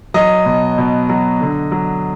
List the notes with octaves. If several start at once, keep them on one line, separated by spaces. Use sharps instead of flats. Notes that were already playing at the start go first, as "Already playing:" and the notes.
F#3 D#5
B2
B2
F#3
D3
F#3